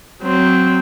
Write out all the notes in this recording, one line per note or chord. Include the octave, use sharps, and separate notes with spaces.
F#3 C4